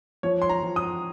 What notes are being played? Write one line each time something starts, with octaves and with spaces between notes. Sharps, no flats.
F3 C#5
C6
A#5
F3
D#6